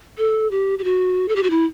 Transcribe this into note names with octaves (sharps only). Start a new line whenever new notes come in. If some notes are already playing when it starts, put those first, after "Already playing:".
A4
G4
G4
F#4
A4
G4
F#4
E4